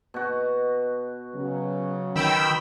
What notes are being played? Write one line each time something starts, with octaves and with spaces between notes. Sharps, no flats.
B2 F#4
C#3 F#3
D#3 G5 B5 E6